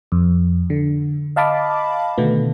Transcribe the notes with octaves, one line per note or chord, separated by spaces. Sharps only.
F2
D3
D#5 F5 A5 B5 D6
B2 D3 D#3 A3 B3